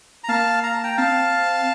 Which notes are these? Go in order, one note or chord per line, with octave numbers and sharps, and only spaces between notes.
A#5
A#3 F5 A5
A#5
A5
G5 A#5
C4 F5 A5